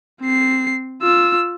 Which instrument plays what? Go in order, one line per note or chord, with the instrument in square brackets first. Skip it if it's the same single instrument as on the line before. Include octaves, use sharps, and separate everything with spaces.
[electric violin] C4 C7
F4 E6